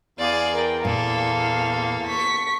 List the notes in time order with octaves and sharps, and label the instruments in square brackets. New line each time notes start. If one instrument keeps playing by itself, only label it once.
[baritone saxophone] E2 [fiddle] G#4 D5 [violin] F5
[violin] A#4 G5
[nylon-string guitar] A#2 [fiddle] A#3 A4 [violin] F5
[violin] C#6 B6